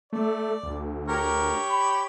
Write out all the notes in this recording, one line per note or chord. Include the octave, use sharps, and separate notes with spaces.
A3 D5
D2
G4 A#4 C#5
B5